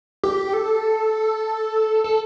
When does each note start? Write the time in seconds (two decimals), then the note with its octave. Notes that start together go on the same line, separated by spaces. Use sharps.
0.24 G4
0.53 A4
2.04 A4